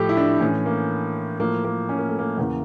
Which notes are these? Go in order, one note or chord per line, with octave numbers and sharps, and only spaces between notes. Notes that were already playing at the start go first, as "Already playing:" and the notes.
Already playing: A2 F3 G4 A4
E4
D4
A2 E3 C#4
A#3
A2 F3 A#3
A#3
C#4
A#3
A3
A#3
E2 C#3 E3 A#3